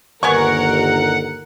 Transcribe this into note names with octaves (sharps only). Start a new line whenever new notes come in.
G1 D#2 B3 A#4 F#5 G#5 C#6